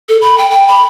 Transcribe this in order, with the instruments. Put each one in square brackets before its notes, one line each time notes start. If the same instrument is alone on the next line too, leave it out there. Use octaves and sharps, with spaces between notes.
[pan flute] A4
B5
G5
G5
B5